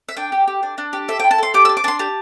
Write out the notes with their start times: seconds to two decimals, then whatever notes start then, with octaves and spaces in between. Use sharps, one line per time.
0.08 E5
0.17 D4 G5
0.32 G4
0.48 G4
0.63 D4
0.78 D4
0.93 G4
1.08 A4 E5
1.19 G5
1.24 E4
1.31 A5
1.38 A4 C6
1.54 G4 D6
1.65 E6
1.69 D4
1.77 D6
1.84 D4 A5 C6
1.99 G4 A5